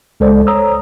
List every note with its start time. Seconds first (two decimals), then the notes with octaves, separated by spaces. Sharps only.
0.20 C#2 G#3 A4 C5 D5
0.47 C#5 A#5 D#6 E6